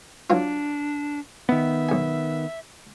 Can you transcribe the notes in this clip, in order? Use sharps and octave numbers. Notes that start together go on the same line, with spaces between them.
E3 F#3 D4 F4
D#3 B3 E5
B1 G#5